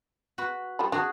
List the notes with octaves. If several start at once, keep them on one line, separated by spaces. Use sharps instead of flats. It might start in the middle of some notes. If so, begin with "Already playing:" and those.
F#4 B4
G3 F4 B5
D4 F#4 G#4